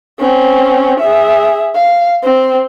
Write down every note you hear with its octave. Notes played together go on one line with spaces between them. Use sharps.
C4 C#4
G#4 E5
F5
C4